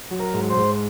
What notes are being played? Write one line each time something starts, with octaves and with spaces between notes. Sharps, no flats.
F#3
A#4
G#2
C5
G#2